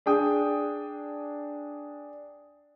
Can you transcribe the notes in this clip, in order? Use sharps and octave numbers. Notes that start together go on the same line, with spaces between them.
D4 G#4 G5 D#6